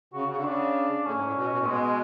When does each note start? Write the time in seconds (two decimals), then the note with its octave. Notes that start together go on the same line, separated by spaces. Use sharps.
0.13 C#3 F#4
0.28 C#3 F#4
0.36 D3
0.44 C#3 D4
1.05 A2 C#4
1.16 G#2
1.25 A2
1.36 B2
1.51 B2
1.58 A2
1.65 B2 G#3
1.81 G#3